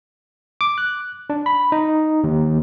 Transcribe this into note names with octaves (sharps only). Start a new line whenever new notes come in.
D6
F#6
D4
B5
D#4
D#2